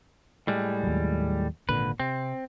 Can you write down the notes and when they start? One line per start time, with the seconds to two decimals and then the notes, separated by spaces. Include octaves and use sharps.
0.47 A2 G3 G#3
0.83 D#2 F#3
1.69 G#1 A#2 D3 B4
2.00 C3 C4